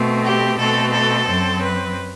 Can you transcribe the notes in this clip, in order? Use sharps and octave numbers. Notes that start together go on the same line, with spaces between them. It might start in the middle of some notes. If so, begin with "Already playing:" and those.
Already playing: B2 A3 C4
G4
B2 A3 C4 A4
A4
F#2 F#3 C4
B4